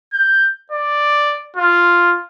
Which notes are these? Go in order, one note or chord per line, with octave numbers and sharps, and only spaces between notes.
G6
D5
F4